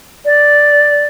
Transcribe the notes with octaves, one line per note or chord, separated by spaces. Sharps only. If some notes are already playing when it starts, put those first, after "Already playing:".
D5